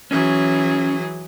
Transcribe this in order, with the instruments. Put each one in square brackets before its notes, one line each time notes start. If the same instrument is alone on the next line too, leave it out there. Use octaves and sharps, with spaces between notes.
[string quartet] E3 F#3 G#4 [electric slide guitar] C#4